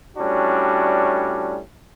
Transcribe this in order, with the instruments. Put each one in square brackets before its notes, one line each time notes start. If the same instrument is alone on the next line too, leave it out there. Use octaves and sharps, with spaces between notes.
[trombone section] A2 G3 C#4 D4 F#4